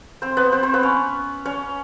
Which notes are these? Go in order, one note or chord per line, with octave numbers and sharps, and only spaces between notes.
C4 C5
B3 B4
C4 C5
C4 C5
B3 B4
C#4 C#5
C#4 C#5